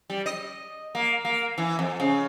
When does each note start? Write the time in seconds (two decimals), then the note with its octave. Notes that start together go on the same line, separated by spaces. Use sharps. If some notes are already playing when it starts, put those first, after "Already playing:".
0.10 G3
0.26 D#5
0.95 A#3
1.25 A#3
1.58 E3
1.79 F2
2.00 C#3